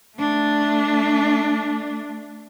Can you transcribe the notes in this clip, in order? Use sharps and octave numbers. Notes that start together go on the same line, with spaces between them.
A3 D4